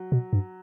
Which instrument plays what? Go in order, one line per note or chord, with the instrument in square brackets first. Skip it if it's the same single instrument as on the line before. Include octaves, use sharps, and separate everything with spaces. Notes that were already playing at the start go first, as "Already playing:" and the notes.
Already playing: [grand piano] F#3
[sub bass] B2
G2